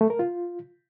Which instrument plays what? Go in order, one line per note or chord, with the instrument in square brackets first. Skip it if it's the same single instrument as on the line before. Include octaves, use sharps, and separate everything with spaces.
[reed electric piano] A3
A#4
F4